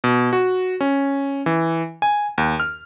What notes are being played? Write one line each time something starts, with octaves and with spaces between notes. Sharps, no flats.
B2
F#4
C#4
E3
G#5
D#2
F6